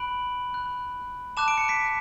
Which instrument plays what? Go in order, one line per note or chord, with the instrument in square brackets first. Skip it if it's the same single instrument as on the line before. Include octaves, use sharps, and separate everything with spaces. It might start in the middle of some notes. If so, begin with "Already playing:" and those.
Already playing: [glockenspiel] B5 F#6 D7 F#7
B5 F#6
A5 D6 F#6 E7
D7
C#7
B6 D7